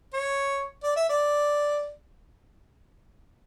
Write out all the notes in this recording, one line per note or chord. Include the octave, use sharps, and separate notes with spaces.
C#5
D5
E5
D5